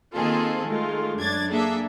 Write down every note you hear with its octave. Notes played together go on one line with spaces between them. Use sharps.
D#3 A#3 C4 F4 G#4 A4
D#3 G#3 A3 F4
F#2 D4 G#6 A6
A#3 D4 G#4 A4 E5